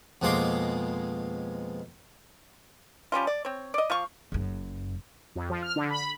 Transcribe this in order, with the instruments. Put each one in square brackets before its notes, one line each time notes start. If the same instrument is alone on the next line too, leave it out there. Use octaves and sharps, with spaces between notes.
[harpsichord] F2 B2 G#3 A#3 C6 D6
[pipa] F3 G3 C#4 F4
D5
C4 C#5
D5 D#5
F3 F5 C#6
[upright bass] F#1 F#2
[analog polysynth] F2
F3
F6
D3
B5